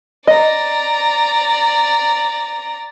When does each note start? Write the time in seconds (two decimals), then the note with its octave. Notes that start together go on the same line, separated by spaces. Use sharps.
0.27 D5 D#5 A#5